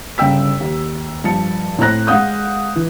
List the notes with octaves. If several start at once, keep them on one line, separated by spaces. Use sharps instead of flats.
G1 C#3 G5 E6 B6
D#2
G2 F3 A5 C#7
A2 C4 C5 A#5 F#6 A#6
G#3 F5 F#5 D#6 G6
E3